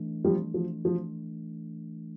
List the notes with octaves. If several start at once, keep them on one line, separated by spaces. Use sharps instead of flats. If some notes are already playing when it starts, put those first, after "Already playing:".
Already playing: E3 A3 D4
F3 G3
F3
F3